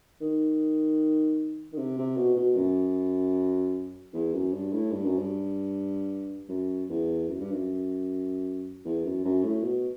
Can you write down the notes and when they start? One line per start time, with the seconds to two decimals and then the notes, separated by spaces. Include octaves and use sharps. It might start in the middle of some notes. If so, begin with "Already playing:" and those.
0.21 D#3
1.72 D#3
1.78 C3
1.98 C3
2.17 B2
2.37 B2
2.56 F#2
4.14 E2
4.34 F#2
4.53 G2
4.73 A2
4.92 G2
5.05 F#2
5.18 G2
6.49 F#2
6.89 E2
7.29 F#2
7.40 G2
7.53 F#2
8.85 E2
9.05 F#2
9.24 F#2
9.44 A2
9.63 B2